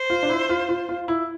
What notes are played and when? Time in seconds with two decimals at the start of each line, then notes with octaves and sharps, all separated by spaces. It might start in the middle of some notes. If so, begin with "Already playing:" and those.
Already playing: C5
0.10 F4
0.23 D4
0.29 E4
0.49 F4
0.69 F4
0.89 F4
1.08 E4